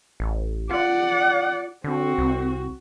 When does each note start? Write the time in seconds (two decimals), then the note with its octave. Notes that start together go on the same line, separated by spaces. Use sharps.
0.20 A1
0.71 F4 D5 F#5
1.84 D3 C4 F#4
2.18 C2